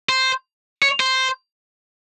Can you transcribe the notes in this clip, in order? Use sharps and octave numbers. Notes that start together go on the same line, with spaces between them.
C5
C#5
C5